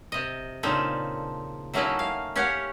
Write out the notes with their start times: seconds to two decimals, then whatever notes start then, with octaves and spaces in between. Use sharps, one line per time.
0.12 C3 D#5
0.63 A#2 C#3 C4 D4 D#4 A4
1.74 F#3 A3 A#3 C#4 D#4 E4
1.99 F5
2.36 C#4 G4 C#5 F5 F#5